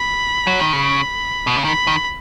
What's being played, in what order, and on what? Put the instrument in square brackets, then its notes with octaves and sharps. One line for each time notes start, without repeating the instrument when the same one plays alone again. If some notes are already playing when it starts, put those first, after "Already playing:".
Already playing: [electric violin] B5
[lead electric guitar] F#3
D#3
[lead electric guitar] C#3 [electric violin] B5
[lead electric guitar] B2
C#3
[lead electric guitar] D#3 [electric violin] B5
[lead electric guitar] D#3